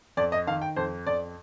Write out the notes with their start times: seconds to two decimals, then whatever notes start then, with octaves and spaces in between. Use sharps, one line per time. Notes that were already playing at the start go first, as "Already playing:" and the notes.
0.17 F2 D5
0.32 D#5
0.47 D#3 F5
0.62 G5
0.76 F2 C5
1.06 F2 D5